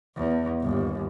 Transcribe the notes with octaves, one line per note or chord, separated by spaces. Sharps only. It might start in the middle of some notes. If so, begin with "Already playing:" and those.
E2
G1 D#2